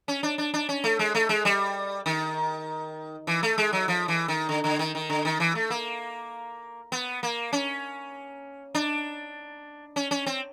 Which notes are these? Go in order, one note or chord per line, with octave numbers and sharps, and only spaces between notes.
C#4
D4
D4
D4
C#4
A3
G#3
A3
G#3
G3
D#3
E3
A3
G#3
F#3
F3
E3
D#3
D3
D3
D#3
D#3
D3
D#3
E3
A3
A#3
B3
A#3
C#4
D4
C#4
C#4
C4